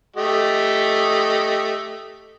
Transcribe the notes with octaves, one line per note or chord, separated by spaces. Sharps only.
A3 G4 D#5